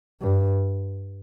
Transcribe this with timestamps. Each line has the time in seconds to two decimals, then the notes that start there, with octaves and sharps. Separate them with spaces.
0.22 G2